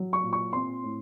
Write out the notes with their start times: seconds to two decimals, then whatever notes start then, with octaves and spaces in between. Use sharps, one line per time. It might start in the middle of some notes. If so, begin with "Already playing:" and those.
Already playing: F#3
0.13 C#6
0.23 A#2
0.33 C#6
0.53 C4 C6
0.84 A2